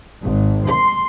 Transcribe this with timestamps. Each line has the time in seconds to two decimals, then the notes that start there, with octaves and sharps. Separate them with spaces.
0.22 G#1
0.68 C6